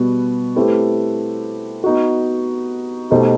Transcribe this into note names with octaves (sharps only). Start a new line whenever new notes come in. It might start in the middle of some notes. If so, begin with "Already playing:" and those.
Already playing: B2 G3 B3 F#4
A3 C4 E4 G4 B4
B3 D#4 F#4
B2 A3 D#4 G4 C5